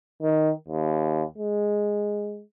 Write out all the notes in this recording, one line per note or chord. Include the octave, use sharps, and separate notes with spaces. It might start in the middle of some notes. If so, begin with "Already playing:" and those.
D#3
D#2
G#3